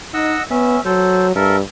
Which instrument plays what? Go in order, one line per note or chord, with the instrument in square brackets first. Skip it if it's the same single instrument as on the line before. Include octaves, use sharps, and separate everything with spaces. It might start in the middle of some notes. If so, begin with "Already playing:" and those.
[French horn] D#4 [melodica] D#5 F#5 E6
[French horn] B3 [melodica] C#4 E5
[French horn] F#3 [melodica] A4 C5
[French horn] G2 [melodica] A4 A#4 E5